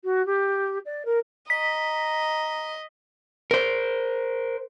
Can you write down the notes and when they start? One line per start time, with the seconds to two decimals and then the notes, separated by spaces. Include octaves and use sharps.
0.04 F#4
0.26 G4
0.85 D5
1.05 A#4
1.50 D#5 A#5 B6
3.51 A#4 C5